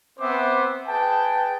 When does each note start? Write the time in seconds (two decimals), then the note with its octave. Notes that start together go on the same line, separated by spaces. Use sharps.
0.19 B3 C4 C5 E5 D6
0.87 G#4 B4 G5 A5